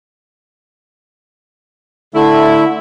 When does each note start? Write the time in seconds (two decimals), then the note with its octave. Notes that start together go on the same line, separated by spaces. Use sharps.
2.14 D3 A3 E4